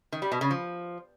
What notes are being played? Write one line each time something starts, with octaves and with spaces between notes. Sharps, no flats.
D#3
G3
B2
C#3
F3